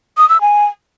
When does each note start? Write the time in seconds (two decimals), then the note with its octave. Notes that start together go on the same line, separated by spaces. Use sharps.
0.18 D#6
0.29 E6
0.41 G#5